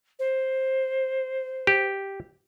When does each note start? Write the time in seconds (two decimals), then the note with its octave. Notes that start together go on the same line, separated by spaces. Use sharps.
0.19 C5
1.67 G4